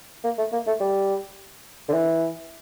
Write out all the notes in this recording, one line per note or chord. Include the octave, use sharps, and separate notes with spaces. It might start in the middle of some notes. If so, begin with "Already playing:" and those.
A#3
A3
A#3
A3
G3
D3
E3